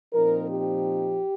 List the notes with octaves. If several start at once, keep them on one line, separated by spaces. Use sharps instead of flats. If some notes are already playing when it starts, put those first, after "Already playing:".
A#2 F3 C4 D#4 A#4
G4